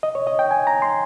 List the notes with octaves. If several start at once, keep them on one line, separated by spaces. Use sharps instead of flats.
D#5
C#5
D#5
G5
G#5
A#5
C6